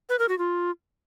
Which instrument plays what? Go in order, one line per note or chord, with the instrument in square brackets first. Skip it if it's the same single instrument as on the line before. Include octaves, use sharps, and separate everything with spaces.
[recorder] B4
A#4
F#4
F4